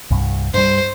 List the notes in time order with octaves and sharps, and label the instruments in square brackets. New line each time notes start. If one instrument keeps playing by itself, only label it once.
[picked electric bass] C2 G2
[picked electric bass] G2 G3 [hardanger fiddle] C5